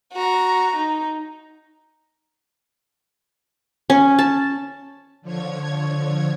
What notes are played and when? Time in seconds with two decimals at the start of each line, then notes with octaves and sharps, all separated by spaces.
0.13 F#4 A#5
0.76 D#4
3.90 C#4
4.19 A5
5.22 D3 F3 C#5 G#6